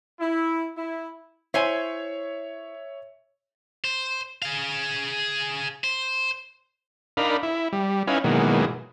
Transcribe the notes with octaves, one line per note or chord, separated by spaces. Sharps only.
E4
E4
E4 C5 C#5 E5 G#5
C5
G#4 F5
C5
D4 D#4 A#4 F5 B5
E4
G3
C#4 D#4 E4 B4 F5 G#5
B2 D#3 E3 F#3 G#3 A#3